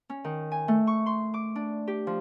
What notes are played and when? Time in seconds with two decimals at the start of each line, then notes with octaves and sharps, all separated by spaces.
0.10 C#4
0.24 D#3
0.52 G#5
0.68 A3
0.87 C#6
1.06 C6
1.34 D6
1.56 D4
1.87 G4
2.07 F3